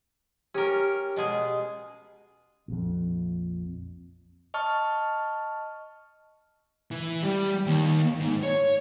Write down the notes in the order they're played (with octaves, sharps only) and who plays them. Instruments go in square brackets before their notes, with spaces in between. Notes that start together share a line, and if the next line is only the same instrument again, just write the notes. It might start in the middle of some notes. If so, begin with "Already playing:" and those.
[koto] C#4 A#4 [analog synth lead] G4
[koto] B2 G#3 G#4
[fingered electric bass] A#1 F2
[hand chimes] D#5 A5 C#6 F6
[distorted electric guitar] E3
G3
D#2
G#2
C#5